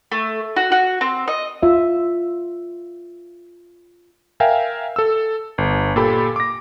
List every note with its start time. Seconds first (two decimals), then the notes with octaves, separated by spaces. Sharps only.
0.12 A3
0.56 F#4
0.72 F#4
1.01 C4
1.28 D#5
1.63 F4 E5
4.40 A#4 E5 F5 G5 G#5
4.96 A4 E6
5.58 G1
5.96 A#2 G4 A4 B5
6.36 D6 A#6